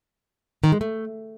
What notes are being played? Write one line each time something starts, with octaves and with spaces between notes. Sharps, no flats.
D#3
G#3
A3